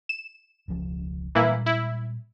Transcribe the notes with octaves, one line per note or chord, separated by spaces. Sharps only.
E7
E1 C#2 F3
A#2 E3 G3 G#3 A#3 E4
E4